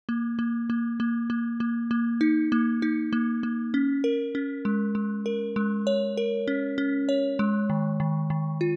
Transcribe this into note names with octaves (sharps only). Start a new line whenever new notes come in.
A#3
A#3
A#3
A#3
A#3
A#3
A#3
D#4
A#3
D#4
A#3
A#3
C#4
A#4
C#4
G#3
G#3
A#4
G#3
C#5
A#4
C#4
C#4
C#5
G#3
D#3
D#3
D#3
F4